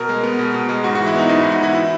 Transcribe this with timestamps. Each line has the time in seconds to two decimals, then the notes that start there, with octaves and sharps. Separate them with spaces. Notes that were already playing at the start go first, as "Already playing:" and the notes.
Already playing: B2 A#4
0.09 G#3
0.23 B3
0.39 B2
0.54 B2
0.69 G#3
0.84 G#2 F#4
0.95 E3 F#4
1.07 E4
1.14 B3 D#4
1.29 G#2 D#4
1.41 G#2 E4
1.52 F#4
1.60 E3 E4
1.75 E4